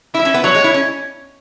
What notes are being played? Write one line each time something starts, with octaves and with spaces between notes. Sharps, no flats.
E4 E5
C#4
B3
F#3 C#5
G#3
E4
C#4